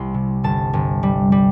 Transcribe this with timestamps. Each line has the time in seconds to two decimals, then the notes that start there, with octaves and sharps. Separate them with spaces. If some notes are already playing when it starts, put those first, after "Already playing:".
Already playing: C2 C6
0.14 C3
0.44 G1 A5
0.73 G1
1.03 G3
1.32 G3